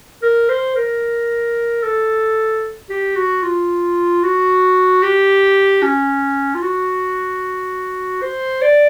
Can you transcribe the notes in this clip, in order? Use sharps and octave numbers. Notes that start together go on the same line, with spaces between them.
A#4
C5
A#4
A4
G4
F#4
F4
F#4
G4
C#4
F4
F#4
C5
D5